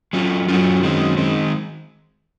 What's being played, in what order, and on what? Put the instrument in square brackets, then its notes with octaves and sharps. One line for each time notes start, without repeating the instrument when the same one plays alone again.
[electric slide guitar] F#3 C#4 F4
[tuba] F#2 [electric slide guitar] F#3 C#4 F4
[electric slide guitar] D#3 G#3 C4
D#3 G#3 C4